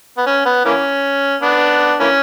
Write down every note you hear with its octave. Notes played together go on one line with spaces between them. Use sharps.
B3
C#4
B3
E3 A#3 C#4
B3 D4
E3 A#3 C#4